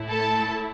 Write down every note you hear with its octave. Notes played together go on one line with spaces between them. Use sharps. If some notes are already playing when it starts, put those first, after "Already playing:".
Already playing: A2 A3 E4
A4 A5